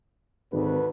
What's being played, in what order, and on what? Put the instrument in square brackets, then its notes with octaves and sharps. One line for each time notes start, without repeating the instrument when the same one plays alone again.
[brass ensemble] G#1 [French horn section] D2 B4